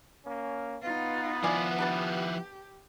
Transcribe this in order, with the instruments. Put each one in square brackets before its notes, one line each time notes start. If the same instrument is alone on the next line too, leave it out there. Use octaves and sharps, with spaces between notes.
[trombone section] A#3 C#4
[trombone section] B3 [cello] D#4 F4
[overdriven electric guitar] F3 E4 [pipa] D5 G#5
[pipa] D4 B4 A5 [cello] G4